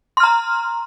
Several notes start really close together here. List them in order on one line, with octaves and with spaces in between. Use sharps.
C6 F6 A#5